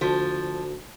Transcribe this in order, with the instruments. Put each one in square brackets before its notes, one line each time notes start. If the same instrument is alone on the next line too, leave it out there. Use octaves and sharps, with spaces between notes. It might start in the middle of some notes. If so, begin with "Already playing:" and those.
[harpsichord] D2 [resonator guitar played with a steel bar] F3